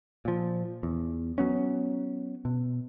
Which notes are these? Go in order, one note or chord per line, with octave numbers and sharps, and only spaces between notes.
A#2 F3
E2
F#3 B3 C#4
B2